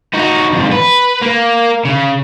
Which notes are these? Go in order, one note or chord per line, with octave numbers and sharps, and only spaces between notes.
D#4 F#4
F2 G#2
B4
A#3
C#3